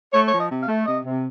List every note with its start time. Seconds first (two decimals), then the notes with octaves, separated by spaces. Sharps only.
0.12 A3 C#5
0.26 F3 C#5
0.37 D#5
0.49 C3
0.61 F5
0.67 A3
0.86 C3 D#5
1.04 C3